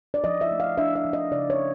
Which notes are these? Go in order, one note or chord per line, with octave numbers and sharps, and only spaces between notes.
D5
F3 D#5
E5
A3
F5
D4 E5
E5
F3
D#5
C#3 D5
C#5